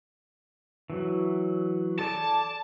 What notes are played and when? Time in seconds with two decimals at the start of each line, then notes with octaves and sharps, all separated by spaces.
0.90 E3 F#3
1.99 A4 D5 G#5 A5